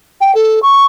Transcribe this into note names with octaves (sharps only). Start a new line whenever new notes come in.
G5
A4
C#6